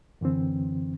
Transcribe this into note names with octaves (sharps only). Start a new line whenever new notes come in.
F#2 D3 E3 C4